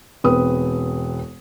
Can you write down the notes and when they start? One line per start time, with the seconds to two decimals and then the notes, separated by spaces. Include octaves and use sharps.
0.24 E1 C4 B4 D#6